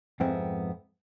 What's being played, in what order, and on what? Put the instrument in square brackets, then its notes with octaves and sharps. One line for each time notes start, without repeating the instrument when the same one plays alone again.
[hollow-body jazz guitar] F2 G#2 B3 C4 E4